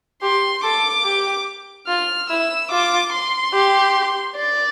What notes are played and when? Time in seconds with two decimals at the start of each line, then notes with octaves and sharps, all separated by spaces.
0.22 G4 C6
0.64 A4 D6
1.05 G4
1.88 F4 F6
2.29 E4 E6
2.71 F4 D6
3.12 C6
3.54 G4
4.37 D5